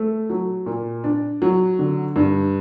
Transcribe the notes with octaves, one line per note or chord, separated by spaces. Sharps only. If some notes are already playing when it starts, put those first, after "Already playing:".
Already playing: A3
F#3
A#2
D4
F#3
D3
G2